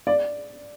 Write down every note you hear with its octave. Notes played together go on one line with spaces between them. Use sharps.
D5